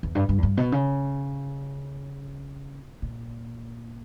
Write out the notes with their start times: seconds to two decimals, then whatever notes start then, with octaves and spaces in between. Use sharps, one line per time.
0.03 E2
0.15 G2
0.29 G2
0.38 E2
0.43 G2
0.57 B2
0.72 C#3
3.02 A#2